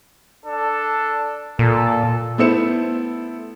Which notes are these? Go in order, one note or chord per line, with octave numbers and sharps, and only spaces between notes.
D4 A4
A#2 A4
A3 B3 E4 C5 C#7 E7